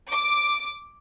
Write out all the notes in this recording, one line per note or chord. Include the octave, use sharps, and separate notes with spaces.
D6